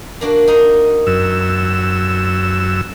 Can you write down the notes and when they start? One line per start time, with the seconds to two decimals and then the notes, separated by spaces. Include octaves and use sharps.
0.21 A#3 D4 F#4
0.47 D#4 A#4 C6
1.07 F#2 E6